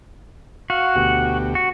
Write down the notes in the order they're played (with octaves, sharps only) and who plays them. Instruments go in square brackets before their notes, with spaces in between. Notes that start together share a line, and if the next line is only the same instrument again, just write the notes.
[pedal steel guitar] F#4 [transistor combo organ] F5
[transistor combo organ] D2 B2 G4
[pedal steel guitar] F#4